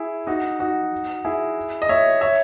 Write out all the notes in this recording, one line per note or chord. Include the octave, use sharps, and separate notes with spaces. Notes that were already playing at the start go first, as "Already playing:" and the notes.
Already playing: E4 G#4
D#4 F#4
D#4 F#4
E4 G#4
D#5
C#5 E5
C#5 E5